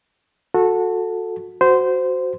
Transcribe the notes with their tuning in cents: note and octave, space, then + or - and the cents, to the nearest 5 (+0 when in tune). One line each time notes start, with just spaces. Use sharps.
F#4 -25 A4 +0
F#4 +0 C5 -15